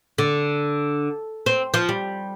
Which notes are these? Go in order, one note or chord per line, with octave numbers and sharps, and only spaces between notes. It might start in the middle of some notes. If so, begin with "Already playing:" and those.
D3
C4
F3
G3